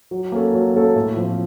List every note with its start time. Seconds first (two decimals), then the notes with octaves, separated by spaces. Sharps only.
0.11 F#3
0.32 A#3 C#4 A4
0.54 F#3
0.74 A#3 C#4 A4
0.95 A2
1.17 F3 C4